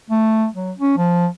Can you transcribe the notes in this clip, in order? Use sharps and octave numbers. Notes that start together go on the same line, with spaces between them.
A3
F#3
C#4
F3